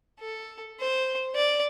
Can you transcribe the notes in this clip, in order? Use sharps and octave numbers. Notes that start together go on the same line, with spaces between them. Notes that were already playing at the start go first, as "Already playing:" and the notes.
A4
C5
D5